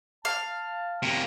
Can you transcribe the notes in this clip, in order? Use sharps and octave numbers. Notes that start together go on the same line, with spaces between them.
F5 A5
C3 A#3